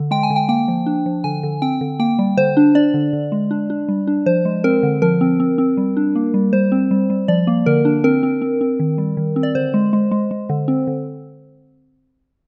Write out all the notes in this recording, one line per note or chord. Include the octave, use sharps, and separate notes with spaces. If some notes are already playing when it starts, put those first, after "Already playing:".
Already playing: D3
G#3 G5
G#5
D3
G5
A#3 G5
F3
D4
F3
D3 G#5
D3
C4 G5
D3
A#3 G5
G3
D3 C5
D4
D4 D5
D3
D3
G#3
D4
D4
G3
D4
F3 C5
G#3
C4 A#4
D3
F3 A#4
C4
C4
C4
G3
D4
A#3
G3
G3 C5
C4
G3
G3
F3 D5
A#3
D3 A#4
D4
C4 A#4
C4
C4
C4
D#3
G3
D#3
C4
D5
D3 C5
G#3
G#3
G#3
G#3
D3
C4
D3